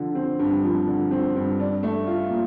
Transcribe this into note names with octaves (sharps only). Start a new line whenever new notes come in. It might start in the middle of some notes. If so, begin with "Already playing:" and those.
Already playing: D3 F3
C4
G2
F3
D3
C4
G2
D4
A3
F4
A#2